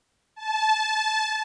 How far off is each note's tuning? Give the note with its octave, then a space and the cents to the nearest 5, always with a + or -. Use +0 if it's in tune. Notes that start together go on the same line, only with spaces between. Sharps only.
A5 -20